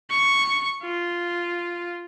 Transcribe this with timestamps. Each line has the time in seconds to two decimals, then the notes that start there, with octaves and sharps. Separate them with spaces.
0.11 C#6
0.82 F4